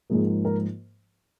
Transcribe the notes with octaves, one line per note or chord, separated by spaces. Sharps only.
G#2 F3 A#3 G#4
A#4